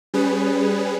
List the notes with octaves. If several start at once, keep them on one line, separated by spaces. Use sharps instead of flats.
G3 C#4 G#4 B4